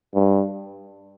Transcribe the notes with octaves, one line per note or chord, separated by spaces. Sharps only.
G2